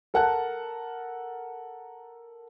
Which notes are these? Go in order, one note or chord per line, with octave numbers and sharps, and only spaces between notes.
A4 A#4 F#5 A5 F#6